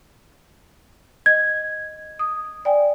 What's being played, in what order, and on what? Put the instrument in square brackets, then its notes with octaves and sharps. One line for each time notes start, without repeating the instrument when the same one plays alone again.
[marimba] D#5 [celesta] G#6
[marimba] D#6
D5 G5 G#5